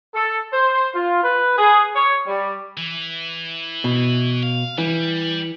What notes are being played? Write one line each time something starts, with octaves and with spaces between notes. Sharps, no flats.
A4
C5
F4
B4
G#4
C#5
G3
E3
B2
F5
E3 G3